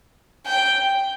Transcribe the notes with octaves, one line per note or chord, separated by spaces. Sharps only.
G5